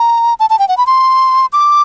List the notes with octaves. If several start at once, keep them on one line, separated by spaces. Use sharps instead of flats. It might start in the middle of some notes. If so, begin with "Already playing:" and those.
Already playing: A#5
A5
A5
G5
F#5
B5
C6
D6